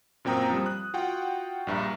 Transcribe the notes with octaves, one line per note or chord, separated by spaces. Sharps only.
F#2 A#2 C4 G5 A#5 D#6
F3 G3
F#6
F4 F#4 F#5 G5
A#1 G2 E5 A#5